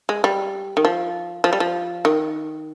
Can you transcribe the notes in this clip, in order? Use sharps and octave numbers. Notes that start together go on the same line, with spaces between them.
G#3
G3
D#3
F3
F3
G3
F3
D#3